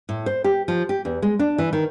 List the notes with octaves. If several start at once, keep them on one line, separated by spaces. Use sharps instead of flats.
A2
C5
G4
F3
G4
E2
G#3
D4
E3
D#3